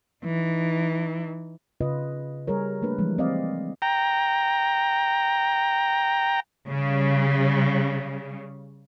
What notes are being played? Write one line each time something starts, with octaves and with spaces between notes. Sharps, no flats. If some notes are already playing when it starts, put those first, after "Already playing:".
E3 D#4
C#3 F4 B4 D#5
G3 G#4 A#4 C#5
A3 A#3 D4 B4
E3 F3 G3 G#3
C4 D5 D#5 F5
G5 A#5
C#3 G3